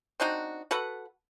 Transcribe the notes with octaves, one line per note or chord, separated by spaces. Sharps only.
C4 D4 D#4 F#4
F#4 A4 B4 F#5